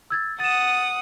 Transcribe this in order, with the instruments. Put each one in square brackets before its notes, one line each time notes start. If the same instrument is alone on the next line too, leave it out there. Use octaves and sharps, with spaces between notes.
[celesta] E6 G#6 A6
[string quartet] F#5 D#6 [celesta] A6 E7